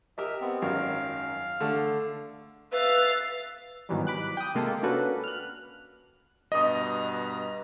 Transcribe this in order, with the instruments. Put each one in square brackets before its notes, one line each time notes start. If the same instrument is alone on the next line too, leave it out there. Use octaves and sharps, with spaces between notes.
[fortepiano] G4 A#4 D#5 [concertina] E5
[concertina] B3 C4
[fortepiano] G#1 F#2 A#4 [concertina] F5
[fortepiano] D3 A3
[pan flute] B4 [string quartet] E5 F5 A6
[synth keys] G#2 B2 D#3 E3 F#3 G3
B5 D6 F#6
G5 D#6
C3 G#3 A#3 F4 G4 A4
A#3 C#4 D4 F#4 A4 B4
F6 F#6
[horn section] G2 B2 A#5 [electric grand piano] D#5 D#6